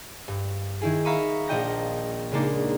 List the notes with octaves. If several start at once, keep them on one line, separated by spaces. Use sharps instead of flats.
G2
D#3 E4 G#4
E5 F5 A#5 B5 C#6 D#6
A#1 D#5 G5 A#6
C#3 G#3 A#3 D4 D#4